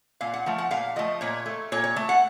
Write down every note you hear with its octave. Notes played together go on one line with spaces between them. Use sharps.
A#2 F5
F#5
F3 A3
F#5
A#2 F5
F3 A3 D#5
A#2 C#5
A3
A#2 C#5
C#5
A3
F#5